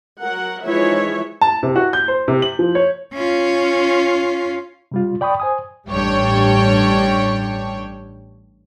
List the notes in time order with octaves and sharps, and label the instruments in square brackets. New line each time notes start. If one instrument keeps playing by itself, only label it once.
[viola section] F#3 A#4 F#5
E3 F3 G#3 D#4 C#5 E5
[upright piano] A5
C3
F#4
G6
C5
C3
F#7
F3
C#5
[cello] C#4 F4
[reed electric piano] C3 G3 F4
D5 G5 B5 C#6 D#6
C5 G#5 D#6
[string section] A1 G2 G3 D4 C#5 G5